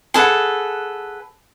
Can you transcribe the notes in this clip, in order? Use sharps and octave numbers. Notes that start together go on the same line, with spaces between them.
G#4 A4 B4 F#5